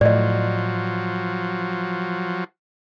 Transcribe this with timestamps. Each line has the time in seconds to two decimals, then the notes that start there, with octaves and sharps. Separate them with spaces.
0.01 A2 F3 F#3 D5 D#5